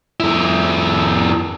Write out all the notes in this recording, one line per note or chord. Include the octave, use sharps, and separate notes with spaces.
F2 E4